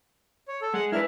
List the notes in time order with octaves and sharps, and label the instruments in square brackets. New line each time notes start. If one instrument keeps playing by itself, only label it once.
[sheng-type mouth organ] C#5
A4
[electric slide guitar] G#3 [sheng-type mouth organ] F#5
[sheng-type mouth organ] D4 A#4 F6 [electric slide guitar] E4 B4